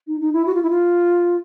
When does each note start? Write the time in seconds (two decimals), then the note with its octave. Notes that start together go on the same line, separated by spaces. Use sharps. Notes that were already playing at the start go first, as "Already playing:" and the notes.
0.07 D#4
0.21 D#4
0.33 E4
0.46 F#4
0.54 F4
0.63 E4
0.70 F4